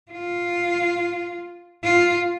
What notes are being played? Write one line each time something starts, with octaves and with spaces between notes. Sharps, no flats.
F4
F4